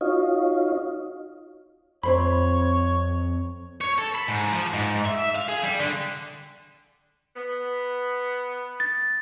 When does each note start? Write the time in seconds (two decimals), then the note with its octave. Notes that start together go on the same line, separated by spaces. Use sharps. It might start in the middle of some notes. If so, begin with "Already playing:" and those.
0.01 D#4 F4 F#4 C#5 D#5 F5
2.03 F2 C4 C5 C#5 B5
3.81 C#5
3.98 A4
4.15 B5
4.27 G#2
4.52 F3
4.74 G#2
5.06 E5
5.36 F5
5.49 G#4
5.64 G3
5.80 D3
7.36 B3
8.80 A6